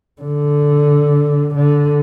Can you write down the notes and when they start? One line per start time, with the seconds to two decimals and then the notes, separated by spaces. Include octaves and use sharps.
0.22 D3
1.55 D3